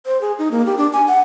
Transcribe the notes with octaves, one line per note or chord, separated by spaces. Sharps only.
C5
G#4
D#4
A#3
G4
D4
G#5
F#5